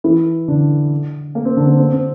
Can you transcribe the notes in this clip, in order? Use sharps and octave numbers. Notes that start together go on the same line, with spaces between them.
E3 E4
D3 D4
A#3
C4
D3 D4
C4
C4
C4